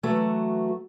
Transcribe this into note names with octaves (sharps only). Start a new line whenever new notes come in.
E3 F#3 A3 F#4